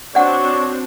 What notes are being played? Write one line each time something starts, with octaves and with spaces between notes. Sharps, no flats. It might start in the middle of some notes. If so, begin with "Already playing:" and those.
C4 D4 F#4 C#5 D5 F#5